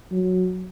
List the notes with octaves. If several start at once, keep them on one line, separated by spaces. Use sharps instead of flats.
F#3